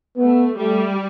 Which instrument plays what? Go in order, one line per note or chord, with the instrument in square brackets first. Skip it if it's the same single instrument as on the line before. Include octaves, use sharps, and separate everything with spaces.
[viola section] A3 [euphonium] B3
[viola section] G3 [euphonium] A3